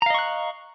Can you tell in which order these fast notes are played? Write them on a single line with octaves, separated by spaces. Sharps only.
A#5 F5 D#5 C#6 F#6